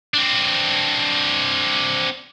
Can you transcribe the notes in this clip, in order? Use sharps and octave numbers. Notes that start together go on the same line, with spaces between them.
C4 D4